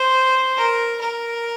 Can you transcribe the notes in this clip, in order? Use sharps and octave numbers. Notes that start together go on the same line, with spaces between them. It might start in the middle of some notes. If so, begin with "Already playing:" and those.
Already playing: C5
A#4
A#4